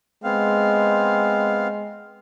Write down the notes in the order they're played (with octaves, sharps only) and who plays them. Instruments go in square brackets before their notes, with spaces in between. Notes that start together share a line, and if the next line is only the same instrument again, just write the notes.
[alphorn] G#3 [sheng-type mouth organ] B3 C4 F5